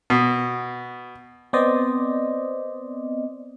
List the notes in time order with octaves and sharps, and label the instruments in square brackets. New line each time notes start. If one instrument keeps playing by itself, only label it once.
[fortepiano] B2
[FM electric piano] B3 C4 C5 D5 D#5